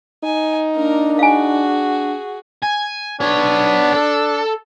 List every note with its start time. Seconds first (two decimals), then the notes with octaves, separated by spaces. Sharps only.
0.24 D#4 G#5
0.75 A#3 D4 A#4
1.19 F#4 G#4 F5 G#5
2.63 G#5
3.21 B3 D4 C#5
3.94 A4